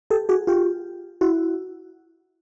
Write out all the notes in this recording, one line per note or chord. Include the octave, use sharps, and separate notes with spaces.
G4 A4
F#4 G#4
F4 G4
E4 F#4